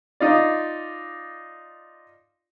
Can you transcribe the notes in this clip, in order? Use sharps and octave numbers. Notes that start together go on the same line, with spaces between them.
D#4 F4 D5